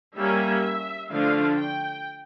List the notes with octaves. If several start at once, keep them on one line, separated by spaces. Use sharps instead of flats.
G3 A#3 C#4 E5
D3 F3 A3 D4 F5
G5